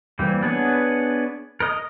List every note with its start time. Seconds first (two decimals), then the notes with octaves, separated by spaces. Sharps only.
0.19 E3 G3 A#3 C4
0.42 B3 D4 G#4 B4 C#5
1.60 A#4 D#5 D#6